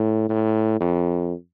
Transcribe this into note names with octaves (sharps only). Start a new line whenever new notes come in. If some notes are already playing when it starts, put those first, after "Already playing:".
Already playing: A2
A2
F2